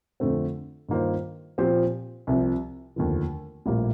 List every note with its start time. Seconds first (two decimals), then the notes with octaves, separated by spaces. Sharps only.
0.20 F2 D3 A3 C4
0.89 G2 D#3 A#3 F4 C5
1.58 A#2 F3 C4 G4 C5
2.27 C2 C3 F3
2.96 F1 D#2 D3 F3
3.66 A#1 A2 G3 A#3